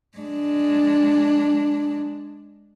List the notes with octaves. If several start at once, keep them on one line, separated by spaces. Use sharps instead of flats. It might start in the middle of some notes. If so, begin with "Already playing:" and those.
G#3 D4